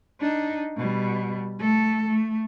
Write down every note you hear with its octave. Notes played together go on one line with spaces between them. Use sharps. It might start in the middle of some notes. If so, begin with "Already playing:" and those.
D4 D#4
B2 G3
A3 A4
A3